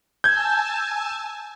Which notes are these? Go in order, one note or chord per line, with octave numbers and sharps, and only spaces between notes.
G#5 A5 E6 G6 G#6